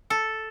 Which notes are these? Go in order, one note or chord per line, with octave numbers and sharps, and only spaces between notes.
A4